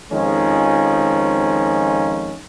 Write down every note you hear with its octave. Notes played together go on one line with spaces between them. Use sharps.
F2 D#3 F3 G#3 C#4